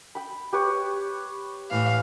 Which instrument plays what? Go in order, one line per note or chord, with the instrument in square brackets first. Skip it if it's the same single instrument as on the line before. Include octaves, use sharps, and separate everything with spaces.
[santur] G5 B5
G4 B4 C#5
[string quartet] A2 E3 F5